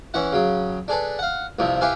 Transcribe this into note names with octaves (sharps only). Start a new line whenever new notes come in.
E3 C#4 E4 F#5
C#3 F#3
D4 G#4 A4 B4
F5 F#5
C2 G2 C3 F3
E4 G4 B4 F5 G#5